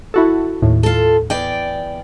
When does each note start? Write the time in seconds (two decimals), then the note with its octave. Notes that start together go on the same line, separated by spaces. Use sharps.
0.14 E4 F#4 A4
0.62 D#2 A2
0.83 F4 A4
1.30 E2 D5 G5